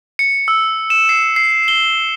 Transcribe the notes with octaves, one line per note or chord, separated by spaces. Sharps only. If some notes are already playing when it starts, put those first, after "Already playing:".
C#7
E6
E7
C7
C7
G7